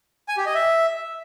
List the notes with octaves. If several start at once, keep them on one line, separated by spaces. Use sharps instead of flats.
G#5
G4
D#5
E5